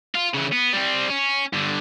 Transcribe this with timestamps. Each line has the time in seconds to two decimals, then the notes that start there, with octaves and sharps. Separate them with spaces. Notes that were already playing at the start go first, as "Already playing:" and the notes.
0.15 F4
0.34 C#3 E3
0.52 B3
0.73 G3 C4
1.10 C#4
1.53 G2 D3